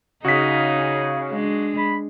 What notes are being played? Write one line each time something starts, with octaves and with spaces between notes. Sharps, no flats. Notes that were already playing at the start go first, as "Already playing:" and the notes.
C#3 D#4 F#4 G#4 B6
G#3 D4
B5